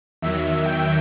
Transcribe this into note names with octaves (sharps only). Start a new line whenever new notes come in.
E2 D#3 F#3 E5
G5